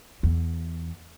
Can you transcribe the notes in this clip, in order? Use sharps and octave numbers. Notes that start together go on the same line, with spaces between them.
E2